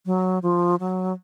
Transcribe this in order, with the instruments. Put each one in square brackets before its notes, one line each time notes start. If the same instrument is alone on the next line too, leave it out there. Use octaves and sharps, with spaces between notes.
[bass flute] F#3
F3
F#3